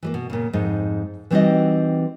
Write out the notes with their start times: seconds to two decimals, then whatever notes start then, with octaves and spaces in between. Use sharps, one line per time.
0.03 E3 G3 A#3
0.14 B2
0.30 A#2 C#3
0.53 F2 G#2 D#4
1.31 E3 G3 C4 D#4 F#4 D#5